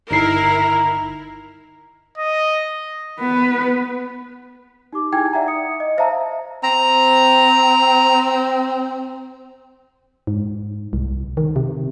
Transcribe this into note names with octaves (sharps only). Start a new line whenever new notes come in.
G1 D#4 E4 A#4 A#5 C7
D#5
B3 B4
D#4 G4 D6
D#4 E4 G#4 G5 G#5 G#6
D5 E5 F#5 A#5
D#6 C#7
D#5
C5 E5 F5 A5 A#5
C4 A#5
G#2
C2
D#3
C3